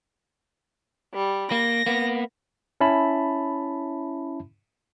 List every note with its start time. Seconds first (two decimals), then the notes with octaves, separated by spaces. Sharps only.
1.14 G3
1.52 A#3 A#6
1.86 A#3 B3
2.81 C#4 E4 E5 A5 B5